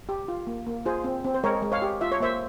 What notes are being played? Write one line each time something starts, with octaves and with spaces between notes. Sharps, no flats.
G4
F4
A#3
A#3
F4 G#4 C5
C4
C4
C5
G#3 A#4 C#5
G#3
C#5 F5
G4
F4 E5
C#5
A#3 C5 E5